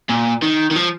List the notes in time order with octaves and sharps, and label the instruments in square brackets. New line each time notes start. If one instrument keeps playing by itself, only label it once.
[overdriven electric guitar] A#2
D#3
D#3
F3